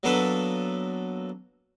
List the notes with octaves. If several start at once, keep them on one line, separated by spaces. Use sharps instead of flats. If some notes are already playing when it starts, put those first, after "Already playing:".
F#3 A#3 B3 D4 A4 B4